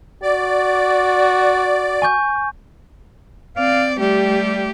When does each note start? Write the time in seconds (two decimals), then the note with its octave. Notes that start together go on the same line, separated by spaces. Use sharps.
0.22 F#4 D5
2.02 G#5 C#6 G6
3.57 C4 D5 F5
3.99 G3 A3 G4